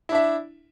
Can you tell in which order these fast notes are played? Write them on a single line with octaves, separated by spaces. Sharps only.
E4 D4 E5